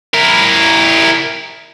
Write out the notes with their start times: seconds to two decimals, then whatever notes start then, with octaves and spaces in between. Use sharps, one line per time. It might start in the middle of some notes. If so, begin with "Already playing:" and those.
0.14 E4 A#4